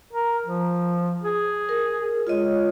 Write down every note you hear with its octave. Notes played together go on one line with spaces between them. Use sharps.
A#4
F3
G#4
A#4
G#3 F4 C#5 D#5